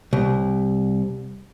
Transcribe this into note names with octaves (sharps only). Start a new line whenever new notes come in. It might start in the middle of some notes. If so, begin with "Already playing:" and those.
C2